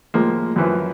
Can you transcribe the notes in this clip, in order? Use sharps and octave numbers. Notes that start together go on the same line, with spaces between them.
A2 F3 G#3 A#3
F#2 E3 F3